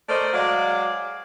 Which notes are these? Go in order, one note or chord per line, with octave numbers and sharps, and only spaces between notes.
A3 A#4 C5 D5 D#5
F#3 G#3 D5 F5